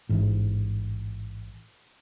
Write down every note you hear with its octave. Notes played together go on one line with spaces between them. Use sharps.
A1 G#2 E3